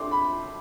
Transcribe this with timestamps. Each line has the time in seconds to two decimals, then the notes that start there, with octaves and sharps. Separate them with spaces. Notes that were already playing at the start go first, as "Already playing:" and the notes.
Already playing: A3 D4 G4 D5 C6
0.11 B5